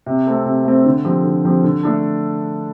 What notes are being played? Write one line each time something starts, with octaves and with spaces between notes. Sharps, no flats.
C3
A3 C4 A4
C3
A3 C4 A4
D3
F3 C4 G4
D3
F3 C4 G4
D3
A3 D4 A4